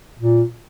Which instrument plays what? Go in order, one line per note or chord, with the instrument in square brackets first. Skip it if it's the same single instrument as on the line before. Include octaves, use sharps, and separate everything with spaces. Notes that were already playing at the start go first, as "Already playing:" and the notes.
[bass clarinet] A#2